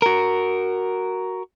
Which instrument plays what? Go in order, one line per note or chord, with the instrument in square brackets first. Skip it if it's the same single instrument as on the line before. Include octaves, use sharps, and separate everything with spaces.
[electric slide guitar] F#4 A#4